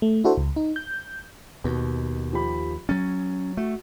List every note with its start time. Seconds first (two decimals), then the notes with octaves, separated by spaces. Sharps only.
0.02 A3
0.24 D4 E4 F#4 A4 C5
0.37 C#2
0.56 D#4
0.76 G6
1.64 D#2 B2
2.33 F3 G4 B5
2.89 F#3 C#4 A6
3.57 A3 F#4